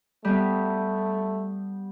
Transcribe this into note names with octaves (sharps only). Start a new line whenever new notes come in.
G3 A3 B3